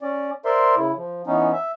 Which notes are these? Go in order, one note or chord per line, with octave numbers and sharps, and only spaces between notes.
C#4 D5
A#4 C5 D5 E5 C6
C#3 E4
F3
E3 B3 C#4 D#4
E5